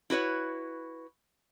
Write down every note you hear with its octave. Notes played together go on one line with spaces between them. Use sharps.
E4 F#4 B4 C#5